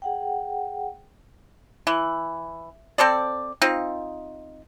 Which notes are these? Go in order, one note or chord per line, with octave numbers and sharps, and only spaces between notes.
G#4 F#5 G5
E3
C4 A4 C5 D5
C4 D#4 F4